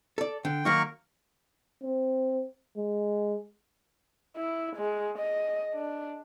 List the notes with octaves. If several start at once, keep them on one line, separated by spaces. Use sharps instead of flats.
A4 D5
D3 G5
D#3 F#3 A#3 D#4 A#4 C#6
C4
G#3
E4
G#3
D#5
D4